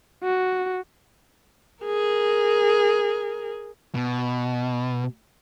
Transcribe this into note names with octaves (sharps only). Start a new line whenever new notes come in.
F#4
G#4 A#4
B2